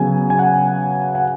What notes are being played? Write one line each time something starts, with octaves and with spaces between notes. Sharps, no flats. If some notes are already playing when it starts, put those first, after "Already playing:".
Already playing: C#3 F#3 B3 G#5
G#5
F#5
F#5